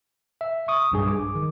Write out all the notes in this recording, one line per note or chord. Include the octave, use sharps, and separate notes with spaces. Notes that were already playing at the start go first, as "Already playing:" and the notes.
E5
C#6 D#6
B1 G2 G#4
D6
D#3